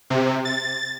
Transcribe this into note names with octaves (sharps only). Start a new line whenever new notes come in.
C3
A6